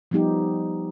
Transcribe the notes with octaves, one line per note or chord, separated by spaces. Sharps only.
F3 G3 B3 D#4 G4